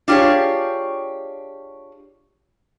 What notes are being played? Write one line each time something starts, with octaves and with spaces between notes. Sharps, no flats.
D4 F4 G4 G#4 C#5